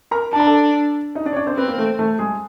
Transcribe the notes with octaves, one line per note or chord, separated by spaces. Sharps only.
A#4 A#5
D4 A5
A#5
A4 A5
D#4 D#5
D4 D5
C#5
D4 D5
C4 C5
B3 C4 B4
A#3 A#4
A3 A4
A3 A4
G#3 G#4